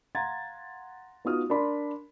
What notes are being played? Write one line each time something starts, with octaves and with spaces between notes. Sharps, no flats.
F5 F#5 A#5 C6 G#6 A6
B3 D#4 F4 F#4 D#6 F6
D4 A#4 D5 B5 C6